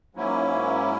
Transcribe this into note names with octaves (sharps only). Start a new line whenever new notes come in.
G#2 F#3 A#3 C#4 E4